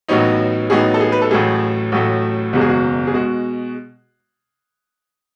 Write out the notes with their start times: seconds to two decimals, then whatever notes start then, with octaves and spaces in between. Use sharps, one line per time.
0.08 A1 A2 F#3 B3 D#4 C#5
0.70 A1 A2 F#3 B3 D#4 G#4
0.94 A4
1.01 G#4
1.12 B4
1.22 A4
1.31 A1 A2 F#3 A3 G#4
1.92 A1 A2 F#3 A3
2.53 F#1 E2 B2 G#3 F#4
2.61 G#4
2.69 F#4
3.07 G#4
3.14 B2 G#3 F#4